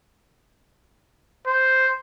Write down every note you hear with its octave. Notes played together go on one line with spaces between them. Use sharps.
C5